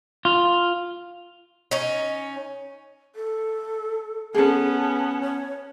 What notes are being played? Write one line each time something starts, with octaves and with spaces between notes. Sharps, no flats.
F4
C#4 D#4
A4
B3 C#4 G#4 A4 A5
C#5